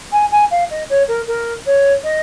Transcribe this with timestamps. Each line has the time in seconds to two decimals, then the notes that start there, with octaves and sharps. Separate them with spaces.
0.12 G#5
0.31 G#5
0.51 F5
0.70 D#5
0.89 C#5
1.08 A#4
1.27 A#4
1.66 C#5
2.03 D#5